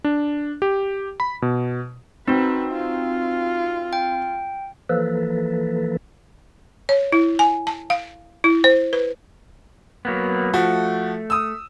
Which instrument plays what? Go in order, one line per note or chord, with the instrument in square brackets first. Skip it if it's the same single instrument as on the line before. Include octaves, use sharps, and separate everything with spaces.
[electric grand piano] D4
G4
B5
B2
[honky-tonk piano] C4 [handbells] D#4 F#4 [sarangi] B4
[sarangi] F4
[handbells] G5
[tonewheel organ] E3 F3 A#3 A4 B4
[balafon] C#5
E4
G#5
A5
F5
E4
C5
B4
[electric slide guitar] F#3 A#3 B3
[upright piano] F3 F#4 [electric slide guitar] A3
[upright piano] D#6 E6